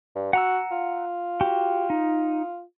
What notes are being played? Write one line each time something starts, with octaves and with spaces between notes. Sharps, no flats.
G2
F#4 F#5 A#5 E6
F4
F#4 G4
D#4